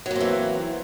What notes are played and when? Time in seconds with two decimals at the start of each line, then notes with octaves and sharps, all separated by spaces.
0.06 F#3
0.11 A#3
0.16 C4
0.21 E3